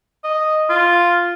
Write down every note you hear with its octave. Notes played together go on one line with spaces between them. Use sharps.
D#5
F4